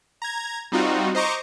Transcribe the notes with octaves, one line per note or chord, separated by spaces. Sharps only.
A#5 G#6
G3 C4 D#4 F4 F#4
C5 D#5 A#5 C#6 D6